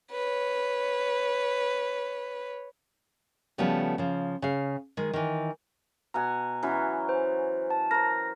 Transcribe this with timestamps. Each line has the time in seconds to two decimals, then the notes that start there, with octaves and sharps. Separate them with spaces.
0.11 B4 C#5
3.58 C#3 F3 G3 A3 B3
3.98 C#3 F3
4.42 C#3 F5
4.97 D#3 G#3
5.13 D#3 E3
6.14 B2 F#5 G#5 A#5
6.63 E3 F#3 C#4
7.09 C5
7.70 A5
7.91 A#4 C5 A#6